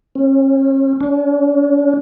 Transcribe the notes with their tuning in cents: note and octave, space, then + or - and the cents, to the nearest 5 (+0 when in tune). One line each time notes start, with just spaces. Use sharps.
C#4 -40
C#4 +45